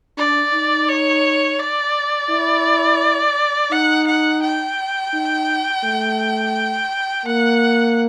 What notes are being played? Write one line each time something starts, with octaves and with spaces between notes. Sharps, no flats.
D4 D5
D#4
C#5
D5
E4
D#4 F#5
F#5
G5
D#4
A3
A#3 F#5